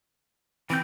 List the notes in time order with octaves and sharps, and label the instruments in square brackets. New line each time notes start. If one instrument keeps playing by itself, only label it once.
[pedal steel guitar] E3 G6 [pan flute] C4